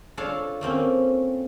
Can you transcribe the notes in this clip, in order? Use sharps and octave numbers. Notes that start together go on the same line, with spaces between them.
D4 F4 A4 C#5 F5 A5
A3 A#3 C4 C#4